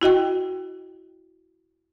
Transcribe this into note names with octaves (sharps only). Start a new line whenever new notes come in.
E4 F#4 D#5 G5